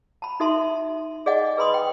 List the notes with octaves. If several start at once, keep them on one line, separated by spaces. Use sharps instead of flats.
A5 B5
D#4 F#4 A4 E5 A5 C6
G#4 D5 D#5 F#5 G#5
G#4 B4 G#5 B5 C6 D#6
G5